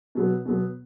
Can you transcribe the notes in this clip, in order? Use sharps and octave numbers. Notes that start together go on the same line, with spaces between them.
B2 F#3 B3
B2 F#3 B3